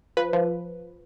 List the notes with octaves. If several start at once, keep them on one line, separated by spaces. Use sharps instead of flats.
F3 B4
F3